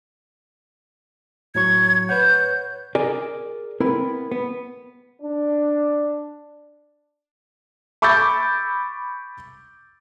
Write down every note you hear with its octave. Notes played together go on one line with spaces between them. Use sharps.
A2 F#3 C#6 G#6
B4 C#5 F#5 G6
G#4 A#4 D5 G#5
B3 C4 E4 A#4 B4
B3
D4
B5 C#6 D6 E6 G6 A6